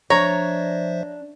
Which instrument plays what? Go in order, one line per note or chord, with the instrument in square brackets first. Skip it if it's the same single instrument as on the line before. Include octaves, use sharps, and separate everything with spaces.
[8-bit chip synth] F3 C5 E5 [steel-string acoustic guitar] D4 [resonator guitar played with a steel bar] C#5 [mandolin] A#5